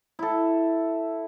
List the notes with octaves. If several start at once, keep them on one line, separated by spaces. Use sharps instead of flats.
E4 A4